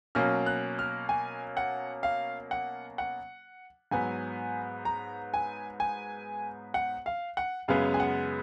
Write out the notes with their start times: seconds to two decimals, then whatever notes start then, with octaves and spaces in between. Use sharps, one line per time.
0.15 B2 F#3 A#3 C#4 F6
0.46 F#6
0.79 F6
1.09 G#5
1.57 F#5
2.03 F5
2.51 F#5
2.98 F#5
3.91 G#2 F#3 B3 G#5
4.85 A#5
5.34 G#5
5.80 G#5
6.74 F#5
7.06 F5
7.37 F#5
7.68 F#2 C#3 G#3 B3 F5
7.94 G#5
8.00 F#5